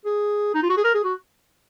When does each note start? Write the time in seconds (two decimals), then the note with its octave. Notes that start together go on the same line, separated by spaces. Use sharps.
0.05 G#4
0.54 D#4
0.63 F4
0.69 F#4
0.77 G#4
0.84 A#4
0.94 G#4
1.04 F#4